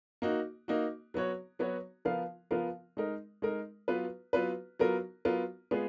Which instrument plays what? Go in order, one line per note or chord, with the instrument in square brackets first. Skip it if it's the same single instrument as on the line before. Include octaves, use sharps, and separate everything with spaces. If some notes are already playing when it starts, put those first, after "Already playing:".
[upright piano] A#3 D#4 F#4
A#3 D#4 F#4
F#3 B3 F#4 C#5
F#3 B3 F#4 C#5
F3 B3 F4 A#4 F5
F3 B3 F4 A#4 F5
G#3 D#4 A#4
G#3 D#4 A#4
F#3 B3 F4 B4
F#3 B3 F4 B4
F#3 B3 F4 A#4
F#3 B3 F4 A#4
G#3 B3 F4 G#4